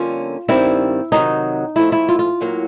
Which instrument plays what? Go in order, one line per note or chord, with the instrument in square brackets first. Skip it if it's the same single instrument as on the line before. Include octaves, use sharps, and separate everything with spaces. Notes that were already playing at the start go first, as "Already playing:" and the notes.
Already playing: [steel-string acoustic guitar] F2 D3 G3 A#3 C#4 [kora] F4
[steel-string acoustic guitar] G2 D#3 G3 C4 [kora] E4
[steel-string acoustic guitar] C3 D#3 F#3 [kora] D#4
[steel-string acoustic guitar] A#2 F3 A3 [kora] E4
[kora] E4
F4
F4
[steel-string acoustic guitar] A2 F#3 A#3